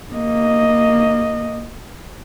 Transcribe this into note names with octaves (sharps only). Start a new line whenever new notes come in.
A#3 D#5